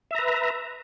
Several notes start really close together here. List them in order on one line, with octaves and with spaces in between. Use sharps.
E5 A#5 B4